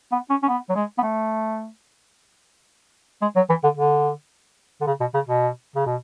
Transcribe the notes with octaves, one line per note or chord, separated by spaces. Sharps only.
B3
C#4
C#4
B3
F#3
G#3
B3
A3
G#3
F#3
E3
D3
D3
D3
C#3
B2
C#3
B2
C#3
B2